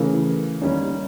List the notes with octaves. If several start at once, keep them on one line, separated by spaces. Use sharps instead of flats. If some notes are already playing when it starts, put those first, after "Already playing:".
Already playing: C#3 E3 A3 A#4
D#3 G3 A#3 C#4